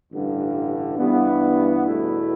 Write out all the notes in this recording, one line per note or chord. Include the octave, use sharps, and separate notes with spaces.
A1 G2 D3
G2 E3 B3
E2 B2 A3 E4